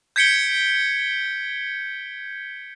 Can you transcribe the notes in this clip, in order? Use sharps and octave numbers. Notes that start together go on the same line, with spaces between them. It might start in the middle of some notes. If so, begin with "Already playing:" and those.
G6 G#6 B6 C#7 D7 G7